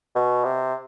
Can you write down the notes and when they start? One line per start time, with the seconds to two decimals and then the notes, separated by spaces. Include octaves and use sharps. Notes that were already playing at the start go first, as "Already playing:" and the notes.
0.16 B2
0.44 C3